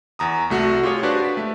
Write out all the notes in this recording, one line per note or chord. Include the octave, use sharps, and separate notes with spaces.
E2 A#5 D#6
C2 A3 F#4
F4 G4 G#4 C#5
D4 F#4 G4 B4 C5 D5
B4 B6
A3